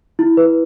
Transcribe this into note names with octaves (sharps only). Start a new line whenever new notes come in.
E4
B4